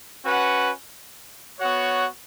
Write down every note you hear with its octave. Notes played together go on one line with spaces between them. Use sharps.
C#4 F#4 B4 F#5
B3 F#4 C#5 F#5